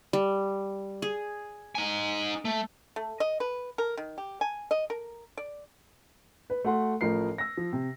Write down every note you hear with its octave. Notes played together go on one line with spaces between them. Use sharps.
G3
G#4
D#4 G#5
A3
A3
D#5
B4
A#4
D#3
G4
G#5
D#5
A#4
D5
B4
A3 F#4 F#5 C6
A1 A2 F3 A#4 C7
E6 A#6
F3
C3